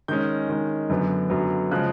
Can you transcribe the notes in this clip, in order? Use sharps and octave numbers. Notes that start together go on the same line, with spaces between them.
D#3 G#3 C#4 G6
D#3 G#3 C#4
F#2 D3 F#3 B3
F#2 D3 F#3 B3
C#3 F3 G#3 F#6